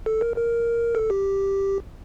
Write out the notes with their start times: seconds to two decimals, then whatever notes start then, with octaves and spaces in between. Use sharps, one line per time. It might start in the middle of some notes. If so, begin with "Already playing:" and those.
0.06 A4
0.21 A#4
0.36 A#4
0.95 A4
1.10 G4